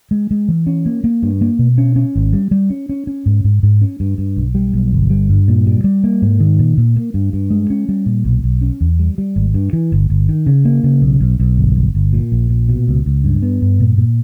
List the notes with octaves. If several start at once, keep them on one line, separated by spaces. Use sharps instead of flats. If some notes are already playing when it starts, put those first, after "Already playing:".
G#3
G#3
E3
C#4
A#3
A#3
G2
A#3
B2
C#4
C#4
G#1
G3
G3
C#4
C#4
C#4
G#2
G#2
G#2
C#4
G2
G2
B1
G3
B1
G1
G3
G2
A#2
G3
G3
A#3
G#2
D#3
A#2
A#2
A#3
G2
G2
G#3
C#4
G3
A#2
B1
B1
C#4
E2
G3
G3
G#1
G2
E3
G1
G1
D#3
C#3
A#3
C#3
B1
B1
B1
G1
G1
G1
A#2
A#1
A#2
B2
C#2
C#2
G2
B3
G2
A#2
A#2